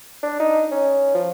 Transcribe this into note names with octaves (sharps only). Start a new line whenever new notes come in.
D4
D#4
C#4
F3